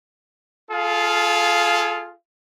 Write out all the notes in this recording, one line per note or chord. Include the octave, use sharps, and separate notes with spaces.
F4 G#4 A4 F5